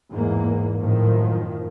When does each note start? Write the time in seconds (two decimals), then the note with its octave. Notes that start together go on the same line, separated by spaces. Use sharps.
0.13 E2 G#2 A#3
0.79 F#2 A2 D#3 F3